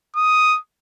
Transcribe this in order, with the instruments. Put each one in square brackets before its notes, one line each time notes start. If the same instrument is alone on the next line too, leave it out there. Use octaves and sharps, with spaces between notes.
[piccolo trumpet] D#6